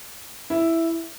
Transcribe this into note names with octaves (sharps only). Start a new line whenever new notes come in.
E4